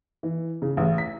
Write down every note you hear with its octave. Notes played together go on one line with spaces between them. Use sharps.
E3
C#3
A1
B6